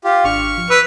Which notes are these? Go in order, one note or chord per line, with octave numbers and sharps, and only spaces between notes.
F4 G4
G#1 D4 C#6 F6
F3
B4 E6